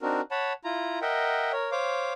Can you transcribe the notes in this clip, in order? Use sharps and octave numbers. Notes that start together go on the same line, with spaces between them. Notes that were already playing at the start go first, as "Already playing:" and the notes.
C4 D4 D#4 F#4 A#4
C#5 F#5 A5 B5
E4 F4 A#5
A#4 D#5 E5 F#5 G5
A#4 C#5
C5 C#5 F5 D6